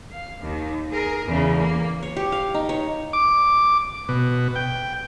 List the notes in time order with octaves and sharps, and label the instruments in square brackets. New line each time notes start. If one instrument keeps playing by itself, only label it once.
[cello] F5
D#2 D#3
G#4 A#4
E2 C#3
A#3
[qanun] C#5
G4
F5
D#4
C#5
[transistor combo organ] D6
B2
G5